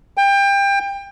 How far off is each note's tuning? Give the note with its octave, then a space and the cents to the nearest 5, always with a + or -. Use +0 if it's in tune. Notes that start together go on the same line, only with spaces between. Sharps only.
G5 +25